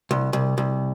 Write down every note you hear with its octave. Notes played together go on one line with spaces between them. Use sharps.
C2
C2
C2